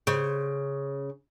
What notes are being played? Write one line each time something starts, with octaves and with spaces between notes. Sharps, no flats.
C#3 C5